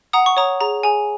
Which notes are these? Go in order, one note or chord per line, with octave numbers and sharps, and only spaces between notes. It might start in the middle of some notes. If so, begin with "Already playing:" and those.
F#5 A#5 D#6
C#6
C#5 A#5 D#6
G#4 A#5
G#4 G#5